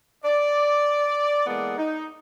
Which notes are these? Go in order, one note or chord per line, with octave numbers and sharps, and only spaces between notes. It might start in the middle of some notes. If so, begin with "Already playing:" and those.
D5
E3 G#3 A#3 B3 A4 D5
D#4